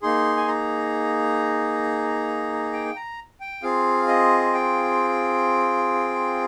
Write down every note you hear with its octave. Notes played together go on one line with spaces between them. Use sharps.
A#3 D#4 G#4 C6
G#5
A#5
G5
A#5
G5
C4 F4 G#4 F5
D#5
G5